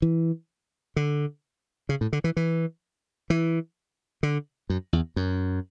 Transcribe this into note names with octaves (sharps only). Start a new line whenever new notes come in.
E3
D3
C#3
A2
D3
E3
E3
E3
D3
F#2
E2
F#2